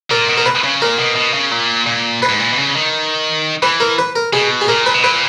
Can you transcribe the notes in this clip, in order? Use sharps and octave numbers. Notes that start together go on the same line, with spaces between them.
A#2 A#4
B2
A#4
B4
C#3
A#2 A#4
B2
B2
C#3
A#2
A#2
B4
G#2
A#2
B2
C#3
D#3
E3 B4
A#4
B4
A#4
B2 G#4
G#4
A#2 A#4
B4
B2
A#2 B4